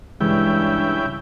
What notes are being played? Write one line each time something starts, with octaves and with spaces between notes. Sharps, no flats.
G2 C#3 E3 G#3 E4 G5